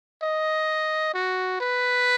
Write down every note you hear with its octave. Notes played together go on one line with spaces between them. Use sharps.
D#5
F#4
B4